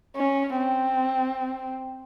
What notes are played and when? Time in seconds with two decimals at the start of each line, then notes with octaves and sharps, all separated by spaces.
0.16 C#4
0.56 C4